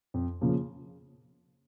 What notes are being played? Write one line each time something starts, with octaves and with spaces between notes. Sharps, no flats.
F2
C#3 F3 A#3